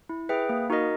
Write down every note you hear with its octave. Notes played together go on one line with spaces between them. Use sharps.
E4
G#4 B4 E5 G5
A#3
D#4 F#4 A#4 D#5